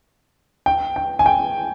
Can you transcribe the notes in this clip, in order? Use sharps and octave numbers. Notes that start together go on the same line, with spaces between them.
G5
G5
G#5
G5